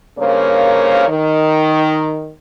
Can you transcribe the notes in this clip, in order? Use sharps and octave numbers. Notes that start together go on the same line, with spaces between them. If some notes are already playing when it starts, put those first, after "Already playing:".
G2 C#3 A#3 A#4 C5 C#5
D#3